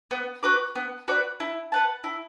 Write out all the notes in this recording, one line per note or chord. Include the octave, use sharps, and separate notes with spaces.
B3
F#4 B4 D5
B3
F#4 B4 D5
E4
B4 F#5 A5
E4